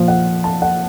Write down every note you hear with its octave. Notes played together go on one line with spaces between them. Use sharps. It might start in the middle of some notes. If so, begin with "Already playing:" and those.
Already playing: A#2 F3
F#5
A5
F#5